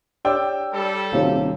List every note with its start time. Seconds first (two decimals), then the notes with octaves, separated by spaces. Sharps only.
0.25 D4 G4 C#5 D5 G5 E6
0.73 G3 A4
1.13 D#1 C3 F#4 C#5 F5